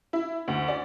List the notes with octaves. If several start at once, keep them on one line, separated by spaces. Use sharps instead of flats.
E4
D2
D5